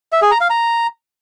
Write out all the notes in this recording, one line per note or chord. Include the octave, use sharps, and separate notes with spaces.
E5
G#4
A#5
F5
A#5